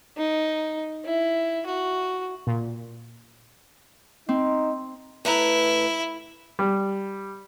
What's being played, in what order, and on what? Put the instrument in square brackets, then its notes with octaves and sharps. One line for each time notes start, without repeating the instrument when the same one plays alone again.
[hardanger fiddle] D#4
E4
F#4
[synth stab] A#2
[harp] C4 [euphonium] D#4
[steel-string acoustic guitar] A2 B4 A#5 [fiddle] E4
[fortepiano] G3